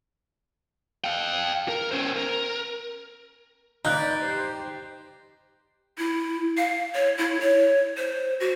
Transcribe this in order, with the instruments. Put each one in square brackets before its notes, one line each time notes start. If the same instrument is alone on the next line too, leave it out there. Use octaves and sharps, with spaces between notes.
[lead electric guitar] F5 G5
A#4
C#4 C5
A#4
[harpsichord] D#4 [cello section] B4 D5 [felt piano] F#6 G6
[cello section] G4 C5
[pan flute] E4
F5
C#5
E4
C#5
C5
F#4